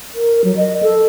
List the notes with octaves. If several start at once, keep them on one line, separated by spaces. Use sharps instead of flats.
A#4
F#3
D#5
A4